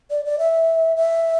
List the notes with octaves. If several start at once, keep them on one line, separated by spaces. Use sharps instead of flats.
D5
D5
E5
E5